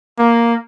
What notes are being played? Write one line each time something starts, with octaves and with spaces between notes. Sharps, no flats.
A#3